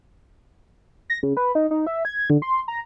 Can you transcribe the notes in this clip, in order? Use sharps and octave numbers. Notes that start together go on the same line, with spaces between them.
A#6
C#3
B4
D#4
D#4
E5
G#6
D3
C6
A#5